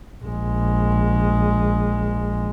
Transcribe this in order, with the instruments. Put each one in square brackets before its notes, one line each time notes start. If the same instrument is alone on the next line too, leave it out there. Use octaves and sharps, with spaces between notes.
[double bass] A#1 G#3